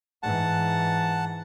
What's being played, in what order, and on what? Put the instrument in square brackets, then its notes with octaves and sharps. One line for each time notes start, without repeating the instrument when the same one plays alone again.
[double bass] G#2 E3 [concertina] F#5 A5